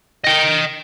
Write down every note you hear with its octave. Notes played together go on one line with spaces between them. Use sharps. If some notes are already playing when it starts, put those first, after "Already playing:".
D#5 G5